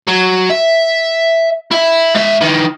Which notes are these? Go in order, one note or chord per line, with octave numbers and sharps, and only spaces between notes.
F#3
E5
E4 E5
G#2 E5
D#3 E3